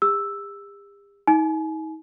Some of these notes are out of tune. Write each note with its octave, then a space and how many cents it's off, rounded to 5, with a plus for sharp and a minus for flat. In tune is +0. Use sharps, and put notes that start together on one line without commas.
G4 +45 E6 +0
D#4 +40 G#5 +35